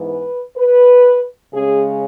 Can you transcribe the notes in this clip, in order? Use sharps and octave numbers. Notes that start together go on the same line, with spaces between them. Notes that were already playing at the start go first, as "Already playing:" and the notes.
Already playing: G#2 E3 B3
B4
B4
C#3 G#3 C#4 G#4